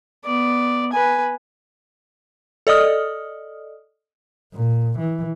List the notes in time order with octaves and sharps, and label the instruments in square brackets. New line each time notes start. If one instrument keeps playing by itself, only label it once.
[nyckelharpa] B3 D5
B4 G#5
[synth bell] A4 D5 D#5 D#6 F6
[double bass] A#2
E3